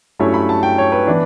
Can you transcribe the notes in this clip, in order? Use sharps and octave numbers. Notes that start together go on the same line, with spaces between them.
G2 F#3 A3 C#4 E4 C#5
B5
A5
G5
C#5
B4
E3 B3 D4